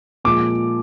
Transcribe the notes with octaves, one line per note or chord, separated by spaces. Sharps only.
A#2 F3 G#3 D6